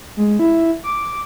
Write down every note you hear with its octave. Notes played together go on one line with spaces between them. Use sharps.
G#3
E4
D6